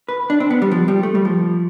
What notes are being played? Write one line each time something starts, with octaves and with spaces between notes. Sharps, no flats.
B4
D4
C4
B3
G3
F3
G3
A3
G3
F3